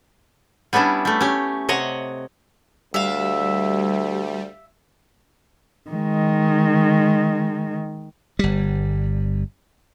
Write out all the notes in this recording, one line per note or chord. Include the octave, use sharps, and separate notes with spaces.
G3 B3 C#4 D4 E4
G3 A3
C#4 G4
C3 C#5 D#5 F#5
D2 G3 E5 F5
D#3 G#3
G1 G3